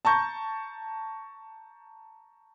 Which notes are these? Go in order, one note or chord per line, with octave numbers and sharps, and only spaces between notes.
A5 A#5 C#6 G6